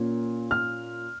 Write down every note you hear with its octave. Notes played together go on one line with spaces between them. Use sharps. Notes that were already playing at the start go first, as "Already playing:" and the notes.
Already playing: A#2 A#3 C#4
F6